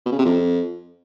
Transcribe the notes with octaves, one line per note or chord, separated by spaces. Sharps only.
B2
C#3
C3
F2